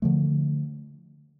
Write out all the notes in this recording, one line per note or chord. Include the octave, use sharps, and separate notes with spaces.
D3 F3 A3